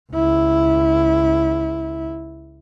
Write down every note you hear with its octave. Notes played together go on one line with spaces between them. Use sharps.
C#2 E4